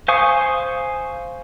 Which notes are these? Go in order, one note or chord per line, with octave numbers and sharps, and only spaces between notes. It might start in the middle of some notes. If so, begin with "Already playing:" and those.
C5 F5 G#5 C#6 D#6